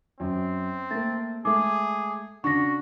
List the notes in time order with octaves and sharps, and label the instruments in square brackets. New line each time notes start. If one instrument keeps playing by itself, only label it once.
[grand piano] F#2 [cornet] C4
[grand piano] A3 A#3 [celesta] A6
[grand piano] G#3 A3 [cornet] G#4 [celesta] D6
[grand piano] C#3 D4 [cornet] F#4 [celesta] C#6 A#6